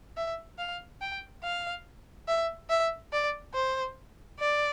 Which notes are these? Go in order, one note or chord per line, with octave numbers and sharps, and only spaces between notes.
E5
F5
G5
F5
E5
E5
D5
C5
D5